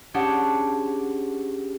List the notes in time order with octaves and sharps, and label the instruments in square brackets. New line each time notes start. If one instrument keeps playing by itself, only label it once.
[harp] C#4 D4 G4 G#4 F#5 A5